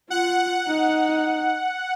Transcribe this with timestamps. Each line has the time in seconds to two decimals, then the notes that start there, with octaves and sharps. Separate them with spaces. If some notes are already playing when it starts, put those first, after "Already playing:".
0.10 F4 F#5
0.67 D#4